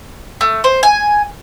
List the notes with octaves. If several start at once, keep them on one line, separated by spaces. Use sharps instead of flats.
A3
C5
G#5